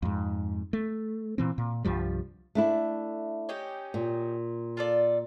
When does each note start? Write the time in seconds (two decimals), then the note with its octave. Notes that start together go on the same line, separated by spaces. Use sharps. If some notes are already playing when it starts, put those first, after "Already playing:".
0.02 F2 G#2
0.73 A3
1.38 A#2 E3 C4
1.58 A#2
1.85 C2 G2 F3 G3
2.55 A3 D4 E4
3.49 C#4 D#4 G4
3.94 A#2
4.77 F4 A4 D5